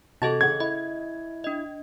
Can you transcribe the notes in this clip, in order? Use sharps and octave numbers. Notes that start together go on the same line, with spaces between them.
C3 F#4 A4 D#5 A5 A6
C#3 F#5 G#6
E4 D#5
D4 D#5